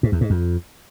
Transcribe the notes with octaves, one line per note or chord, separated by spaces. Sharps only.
G#2
E2
G#2
F2